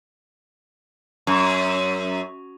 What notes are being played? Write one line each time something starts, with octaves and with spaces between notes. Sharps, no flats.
F#2